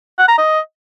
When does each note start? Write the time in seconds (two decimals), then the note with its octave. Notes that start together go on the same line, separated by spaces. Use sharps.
0.18 F#5
0.28 A#5
0.38 D#5